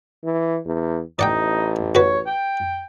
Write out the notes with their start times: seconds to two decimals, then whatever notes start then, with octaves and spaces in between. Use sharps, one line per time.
0.24 E3
0.65 E2
1.19 A1 D#4 D5 F#5 G5
1.95 F#4 B4 C#5
2.27 G5